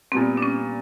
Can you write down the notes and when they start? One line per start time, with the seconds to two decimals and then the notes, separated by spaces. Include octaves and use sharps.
0.12 A#2 G3 B3 C4
0.37 D4
0.42 C#4